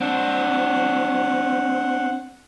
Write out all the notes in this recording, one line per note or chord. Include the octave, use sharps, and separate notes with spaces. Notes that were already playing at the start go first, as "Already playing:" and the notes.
C4 D4 F#5